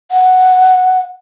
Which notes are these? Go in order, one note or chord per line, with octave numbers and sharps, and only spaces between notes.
F#5